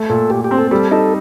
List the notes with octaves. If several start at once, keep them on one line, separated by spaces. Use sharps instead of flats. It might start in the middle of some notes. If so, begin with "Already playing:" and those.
Already playing: A3
A#2 A4
A#2 G4
G4
C4
A4
G3 A4
D#4 A4